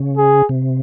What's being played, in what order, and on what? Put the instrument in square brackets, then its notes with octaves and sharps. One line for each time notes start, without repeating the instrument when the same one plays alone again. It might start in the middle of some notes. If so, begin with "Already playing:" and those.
Already playing: [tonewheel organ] C#3
[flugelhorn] G#4
[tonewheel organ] C3